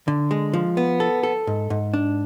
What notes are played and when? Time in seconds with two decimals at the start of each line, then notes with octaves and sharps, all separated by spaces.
0.08 D3
0.31 G#3
0.54 F3
0.77 B3
1.00 A4
1.23 A4
1.47 G#2
1.70 G#2
1.94 D4